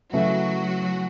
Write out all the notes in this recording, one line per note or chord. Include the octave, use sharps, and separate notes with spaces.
C#3 F#3 A3 E4 F#4 B4 E5